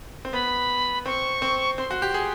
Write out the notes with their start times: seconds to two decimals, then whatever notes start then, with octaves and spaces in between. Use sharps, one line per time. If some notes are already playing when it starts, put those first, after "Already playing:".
0.25 C4
0.33 B3 B5
1.06 C4 C#6
1.42 C4
1.78 C4 C6
1.91 F#4
2.02 G4
2.14 G#4